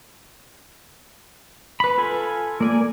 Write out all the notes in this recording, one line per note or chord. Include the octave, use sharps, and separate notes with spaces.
B4 B5
F4 A4 G#5
A#3 D5 G#5